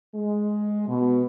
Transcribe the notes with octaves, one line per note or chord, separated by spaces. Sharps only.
G#3
B2